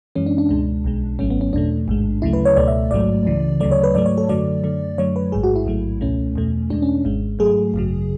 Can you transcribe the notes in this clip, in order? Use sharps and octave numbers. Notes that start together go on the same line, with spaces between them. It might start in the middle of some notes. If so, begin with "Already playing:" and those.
F#2 E3 G#3 C#4
D4
D4
C#2 B2 G#3 D4
B1 B2 G#3
G#1 G#2 F#3 A3 C#4
B3
C#4
E2 B2 A3 D4
A1 G#2 G#3
D2 C#3 F#3 A3 E4
B4
C#5
C#2 B2 A3 D5
E5
A1 G#2 F#3 A3 D5
C#2 C#3 E3
D2 C#3 F#3 A3 D5
C#5
B4
G#2 F#3 A3 D5
C#5
A4
F#2 D3 F#3 A3 D5
F#2 D3 A3
F#2 D3 F#3 A3 C#5
B4
A1 G#2 G#3 G#4
F#4
E4
A1 G#2 F#3 A3
C#2 B2 A3 C#4
E2 B2 A3
E2 B2 G#3 D4
C#4
G#1 G#2 G#3
G#2 F#3 A3 G#4
G#1 F#2 C#3 F#3